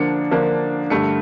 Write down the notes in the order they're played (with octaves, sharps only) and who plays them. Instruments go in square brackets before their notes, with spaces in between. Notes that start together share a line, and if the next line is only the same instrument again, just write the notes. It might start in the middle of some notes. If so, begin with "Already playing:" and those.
Already playing: [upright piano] D3 F3 A#3 D4 C#7
D3 F3 A#3 D4
G2 D3 A3 C#7